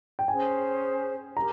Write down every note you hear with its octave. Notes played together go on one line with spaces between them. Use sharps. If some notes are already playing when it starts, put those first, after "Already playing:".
G5
C#4 G#4 C5 G#5
G4 A#4 A#5